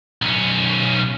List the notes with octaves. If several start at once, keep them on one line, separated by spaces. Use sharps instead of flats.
B1 C#4